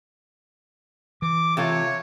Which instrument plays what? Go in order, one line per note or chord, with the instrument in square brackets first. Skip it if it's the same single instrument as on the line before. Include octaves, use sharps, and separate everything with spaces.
[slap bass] E3 [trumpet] D6
[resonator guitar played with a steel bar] C3 A3 F4 [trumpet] C#5